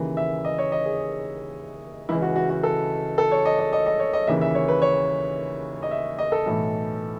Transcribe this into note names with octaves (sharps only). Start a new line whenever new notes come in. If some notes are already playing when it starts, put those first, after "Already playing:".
Already playing: D#2 C#3 E3
E5
D#5
C#5
D#5
G#4
C#2 C#3 E3 E4
F#4
F#4
F#4
A4
A4
C#5
D#5
D#5
D#5
D#5
C#5
D#5
D#2 C#3 E3 E5
E5
C#5
B4
C#5
D#5
E5
D#5
A4
B1 A2 E3